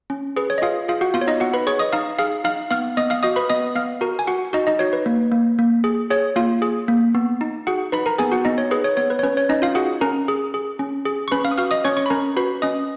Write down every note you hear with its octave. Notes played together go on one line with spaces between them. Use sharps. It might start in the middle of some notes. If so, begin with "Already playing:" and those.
C#4
G#4 B4
C#5
D#5
F4 G#4 F5
F4 G#4 F5
F#4 F#5
B3 F4 F5
C#5
D#4 D#5
B3 F#4 F#5
B4 B5
G#4 C#5 C#6
D#5 D#6
D#4 F5 F6
G#4 F5 F6
D#4 F5 F6
B3 F5 F6
B3 D#5 D#6
F5 F6
F#4 D#5 D#6
B4 B5
B3 D#5 D#6
B3 F5 F6
F#4 A#4 A#5
G#5
F#4 F#5
D#4 F#4 D#5
D#4 D#5
F#4 C#5
B4
A#3
A#3
A#3
G#4
G#4 C#5
A#3 F4 F5
G#4
A#3
B3
D#4
F#4 G#4 F#5
D#4 B4 B5
A#4 A#5
B3 G#4 G#5
F#4 F#5
B3 D#4 D#5
C#5
G#4 B4
C#5
B3 C#5
B4
C#5
C#4 B4
C#5
C#4 D#4 D#5
F4 F5
F#4 G#4 F#5
C#4 A#4 A#5
G#4
G#4
C#4
G#4
C#6
C#4 B4 B5
F5 F6
D#6
F#4 F5 F6
D#5 D#6
C#4 C#5 C#6
C#5 C#6
B5
C#4 A#4 A#5
F#4 B4 B5
C#4 D#5 D#6